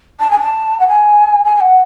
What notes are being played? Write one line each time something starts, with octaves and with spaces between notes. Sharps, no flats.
A5
G#5
A5
F#5
G#5
G#5
G#5
F#5